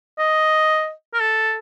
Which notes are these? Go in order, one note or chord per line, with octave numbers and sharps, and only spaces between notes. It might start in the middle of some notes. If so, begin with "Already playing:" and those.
D#5
A#4
A4